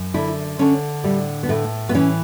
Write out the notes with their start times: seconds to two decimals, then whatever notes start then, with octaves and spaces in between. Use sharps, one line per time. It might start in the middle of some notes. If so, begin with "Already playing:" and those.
Already playing: F#2
0.14 D3 E4
0.59 D3 C#4
1.04 A2 G3
1.43 B3
1.49 A2 A3
1.89 B3
1.94 E3 C#4